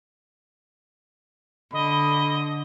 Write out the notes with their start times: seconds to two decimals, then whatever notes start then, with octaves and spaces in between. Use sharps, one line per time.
1.73 D3 D#5 B5